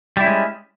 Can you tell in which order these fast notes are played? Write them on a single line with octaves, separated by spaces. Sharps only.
G3 E4 C#4 G#3